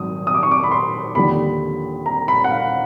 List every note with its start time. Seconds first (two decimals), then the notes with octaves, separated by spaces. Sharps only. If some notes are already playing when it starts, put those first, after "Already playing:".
Already playing: G#1 F#3 D#6
0.27 D#6
0.34 D6
0.43 C#6
0.51 D6
0.64 B5
0.71 C6
1.15 D#2 D3 F3 B5
2.06 A#5
2.28 B5
2.44 F#5
2.51 F5